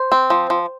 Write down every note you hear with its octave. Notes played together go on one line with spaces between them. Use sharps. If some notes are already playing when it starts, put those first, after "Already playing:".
Already playing: C5
C4
F3
F3